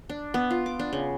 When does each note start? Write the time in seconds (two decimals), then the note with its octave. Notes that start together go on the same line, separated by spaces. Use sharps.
0.09 D4
0.34 B3
0.50 F4
0.66 D6
0.79 D4
0.93 C#3